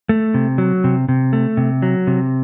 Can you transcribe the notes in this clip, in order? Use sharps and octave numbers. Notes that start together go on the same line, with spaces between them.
A3
C3
F#3
C3
C3
A3
C3
F#3
C3